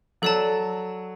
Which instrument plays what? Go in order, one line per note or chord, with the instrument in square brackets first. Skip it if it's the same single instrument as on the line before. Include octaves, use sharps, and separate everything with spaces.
[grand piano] F#3 [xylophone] A4 D5 A5